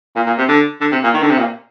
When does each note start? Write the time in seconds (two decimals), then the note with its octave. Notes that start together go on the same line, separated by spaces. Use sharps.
0.16 A#2
0.27 A#2
0.38 C3
0.49 D3
0.81 D3
0.92 C3
1.03 A#2
1.14 D#3
1.22 D3
1.31 C3
1.39 A#2